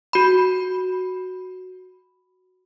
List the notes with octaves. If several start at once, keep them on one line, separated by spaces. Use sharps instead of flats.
F#4 B5